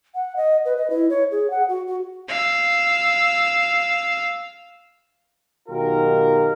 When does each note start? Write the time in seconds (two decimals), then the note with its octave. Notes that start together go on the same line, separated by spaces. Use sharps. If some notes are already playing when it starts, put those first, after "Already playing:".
0.15 F#5
0.36 D#5
0.65 B4
0.77 D#5
0.90 E4
1.10 C#5
1.31 G#4
1.50 F#5
1.68 F#4
1.87 F#4
2.29 F5 E6
5.69 B1 D#3 F#3 F4 G4 A#4